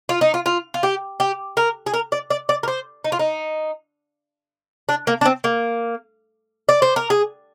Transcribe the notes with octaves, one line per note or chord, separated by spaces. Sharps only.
F4
D#4
F4
F4
F4
G4
G4
A#4
G#4
A#4
D5
D5
D5
A#4
C5
D#4
F4
D#4
D4
A#3
D4
C4
A#3
D5
C5
A#4
G#4